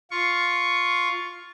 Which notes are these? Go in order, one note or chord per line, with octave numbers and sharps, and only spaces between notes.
F4 C#6